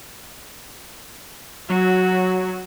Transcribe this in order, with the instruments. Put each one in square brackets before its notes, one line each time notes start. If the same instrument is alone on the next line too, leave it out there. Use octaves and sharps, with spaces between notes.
[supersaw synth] F#3 [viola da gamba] F#4